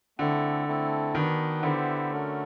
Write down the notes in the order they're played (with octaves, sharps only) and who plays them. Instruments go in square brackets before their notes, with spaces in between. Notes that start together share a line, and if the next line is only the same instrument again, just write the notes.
[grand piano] D3 [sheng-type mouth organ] A3 C4 E4
[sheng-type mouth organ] A3 C4 E4 A4
[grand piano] D#3 [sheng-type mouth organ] B3 D4 F#4 B4
[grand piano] D3 [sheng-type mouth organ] B3 E4 G4 C5 E5
[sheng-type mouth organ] A3 C#4 F#4 A#4